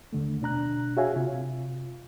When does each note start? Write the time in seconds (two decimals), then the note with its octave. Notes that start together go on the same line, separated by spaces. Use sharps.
0.13 D#2 D3 A3
0.42 B2 D4 A#5 F#6
0.97 F#4 G#4 C#5 E5 F5 G#5
1.14 C3 F4